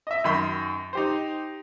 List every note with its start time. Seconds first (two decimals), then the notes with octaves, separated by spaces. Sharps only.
0.07 D#5 E5
0.24 F#2 D#3 B5 C6
0.93 D#4 G4 C5